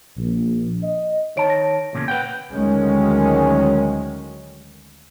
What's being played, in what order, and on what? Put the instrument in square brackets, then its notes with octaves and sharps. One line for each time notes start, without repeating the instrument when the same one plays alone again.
[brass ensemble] A#1
D#5
[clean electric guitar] D#3 A5 [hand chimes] C#5 D7
[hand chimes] A#6
[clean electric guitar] E2 A#2 C#3
B4 F#5 G5
[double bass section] D2 D#3 F#3 G#3 C#4